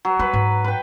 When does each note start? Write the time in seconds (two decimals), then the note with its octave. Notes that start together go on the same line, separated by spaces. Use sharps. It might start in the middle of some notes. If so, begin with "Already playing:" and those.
0.05 F#3
0.19 G3 B4
0.33 G#2
0.64 B4 G5